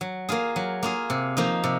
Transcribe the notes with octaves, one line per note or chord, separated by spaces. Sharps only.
F#3
A#3 F4 G#4
F#3
A#3 F4 G#4
C3
F3 A#3 D#4
C3